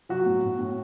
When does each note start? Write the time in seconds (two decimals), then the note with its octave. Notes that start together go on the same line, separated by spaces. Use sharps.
0.09 F#3 F#4
0.26 A2
0.43 A2
0.59 A2